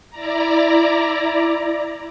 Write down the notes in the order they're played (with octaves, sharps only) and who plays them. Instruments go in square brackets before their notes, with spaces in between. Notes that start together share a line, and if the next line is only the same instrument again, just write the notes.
[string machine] E4 D5 A#5